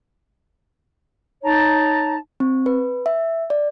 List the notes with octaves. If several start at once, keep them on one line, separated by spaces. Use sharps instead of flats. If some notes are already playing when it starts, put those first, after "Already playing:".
D#4 C#5 A5 A#5
C4
B4
E5
D5